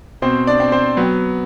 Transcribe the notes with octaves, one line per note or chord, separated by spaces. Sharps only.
B2 C4 C5
D4 D5
C4
C4 C5
F#3 B3 B4